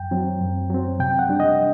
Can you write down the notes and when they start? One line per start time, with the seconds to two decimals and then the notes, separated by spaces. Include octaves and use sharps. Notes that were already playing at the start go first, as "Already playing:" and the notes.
Already playing: F#2 G5
0.11 F#3 C4
0.41 F#2
0.70 F#3 C4
0.99 C3 G5
1.19 F#5
1.29 G3 D4
1.40 D#5